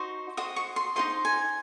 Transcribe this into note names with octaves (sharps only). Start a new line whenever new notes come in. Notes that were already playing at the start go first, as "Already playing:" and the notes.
Already playing: D#4 F#4 C5 D#5 C#6
F#4 C5 D#5 D#6
C#6
C6
D#4 F#4 C5 D#5 C6
G#5